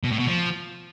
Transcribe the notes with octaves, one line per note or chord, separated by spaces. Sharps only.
B2
A2
B2
F3